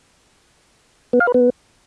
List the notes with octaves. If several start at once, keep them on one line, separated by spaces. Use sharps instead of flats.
B3
F5
B4
B3